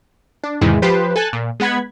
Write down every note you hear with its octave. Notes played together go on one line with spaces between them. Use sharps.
D4
E2 G#2 C3 D#3 E3 G#3
F3 G4 B4 C5
A4 G#5 F#6 A6
A#2
G#3 B3 F#5 B5 G#6